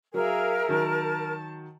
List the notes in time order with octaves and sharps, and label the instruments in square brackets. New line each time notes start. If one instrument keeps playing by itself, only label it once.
[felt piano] F#3 [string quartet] G#4 E5 F5 [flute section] A#4
[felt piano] D#3 F#3 [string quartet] A5